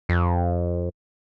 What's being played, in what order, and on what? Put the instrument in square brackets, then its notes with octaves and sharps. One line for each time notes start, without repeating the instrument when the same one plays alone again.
[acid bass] F2